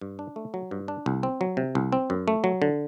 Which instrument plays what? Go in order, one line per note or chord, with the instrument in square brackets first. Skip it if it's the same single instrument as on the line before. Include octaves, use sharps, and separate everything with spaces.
[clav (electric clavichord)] G2
D4
A3
F#3
G2
D4
C2
C4
F#3
C3
C2
C4
F#2
A3
F#3
D3